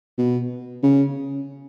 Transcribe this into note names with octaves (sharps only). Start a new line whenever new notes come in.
B2
C#3